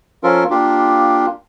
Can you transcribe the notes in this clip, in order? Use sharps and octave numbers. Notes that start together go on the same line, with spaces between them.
F3 C#4 F4 A4 A#4
A#3 D4 F4 G4